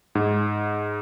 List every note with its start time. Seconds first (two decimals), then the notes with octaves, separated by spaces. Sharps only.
0.15 G#2